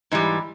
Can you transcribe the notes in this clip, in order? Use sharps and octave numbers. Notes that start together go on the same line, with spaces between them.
G#2 E3 G3